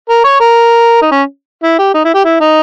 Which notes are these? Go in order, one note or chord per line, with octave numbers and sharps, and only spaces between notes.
A#4
C#5
A#4
D#4
C#4
E4
G4
D#4
E4
G4
E4
D#4